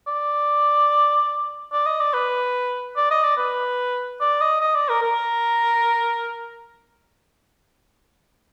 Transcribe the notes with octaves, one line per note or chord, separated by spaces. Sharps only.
D5
D5
D#5
D5
B4
D5
D#5
D5
B4
D5
D#5
D#5
D5
A#4
A#4